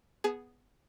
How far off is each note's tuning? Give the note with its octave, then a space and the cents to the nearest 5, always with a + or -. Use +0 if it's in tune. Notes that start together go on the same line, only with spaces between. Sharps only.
B3 +0 G#4 +0 G#5 +45